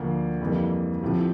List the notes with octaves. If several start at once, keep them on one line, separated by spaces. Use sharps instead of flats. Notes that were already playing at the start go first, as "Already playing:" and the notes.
Already playing: D2 D3 F3 A#3
F2 E3 G3 A#3
A2 F3 C4 E4 G4